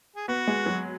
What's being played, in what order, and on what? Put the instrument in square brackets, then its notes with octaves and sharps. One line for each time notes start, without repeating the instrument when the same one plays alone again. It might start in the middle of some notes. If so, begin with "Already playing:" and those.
[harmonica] G#4
[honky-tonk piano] B3 [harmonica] F#4
[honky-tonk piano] G#3
F#3